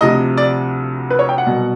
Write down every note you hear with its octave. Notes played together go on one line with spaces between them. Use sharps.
D2 C3 F3 D#5
D5
B4
C#5
G5
F#5
C2 B2 F#3